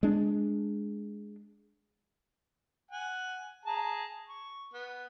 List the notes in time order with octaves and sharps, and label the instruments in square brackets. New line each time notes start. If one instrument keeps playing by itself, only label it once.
[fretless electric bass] G#3 D4
[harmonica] F#5 G#5
G#4 A5 A#5
C#6
B3